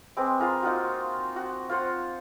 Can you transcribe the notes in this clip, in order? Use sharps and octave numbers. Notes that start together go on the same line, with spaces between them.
G#3 C4 B4 D6
F4 G#4 A#4 G#5
A#3 D#4 F4 F#4
F#4
F4 C5 F#5